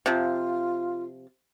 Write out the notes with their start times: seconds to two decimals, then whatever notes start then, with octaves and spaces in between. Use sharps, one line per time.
0.06 C3 F3 F4